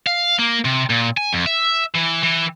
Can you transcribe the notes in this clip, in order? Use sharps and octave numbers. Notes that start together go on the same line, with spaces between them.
F5
A#3
C3
A#2
G#5
F2
E5
E3
E3